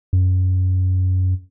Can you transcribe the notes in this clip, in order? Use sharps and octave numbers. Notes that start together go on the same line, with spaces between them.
F#2